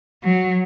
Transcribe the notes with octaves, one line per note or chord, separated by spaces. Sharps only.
F#3